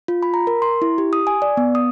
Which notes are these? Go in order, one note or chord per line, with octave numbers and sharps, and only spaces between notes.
F4
B5
A#5
A#4
C6
E4
G4
D#6
G#5
D5
B3
D#6